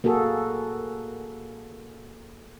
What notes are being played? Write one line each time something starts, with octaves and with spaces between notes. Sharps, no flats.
A#3 F#4 G#4 A4